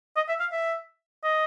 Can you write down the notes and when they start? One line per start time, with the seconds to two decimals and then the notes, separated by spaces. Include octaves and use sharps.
0.16 D#5
0.28 E5
0.40 F5
0.52 E5
1.24 D#5